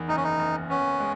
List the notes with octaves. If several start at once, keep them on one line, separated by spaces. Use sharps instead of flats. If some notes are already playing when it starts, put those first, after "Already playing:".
Already playing: E2 D#3
F#1 D#4
C#4
D#4
F#1
B3 C#4
G#3